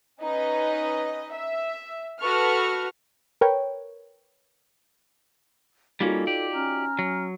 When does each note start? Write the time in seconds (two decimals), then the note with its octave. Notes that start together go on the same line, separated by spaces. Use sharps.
0.21 C#4 D#4 B4 D#5
1.33 E5
2.20 F#4 A4 B4 C#6 F6
3.41 A#4 B4 C#5 G5
6.01 G3 A#3 C#4 D#4 F4 F#4 A4
6.27 G4 D5
6.54 C#4 A#5 F6
6.99 F#3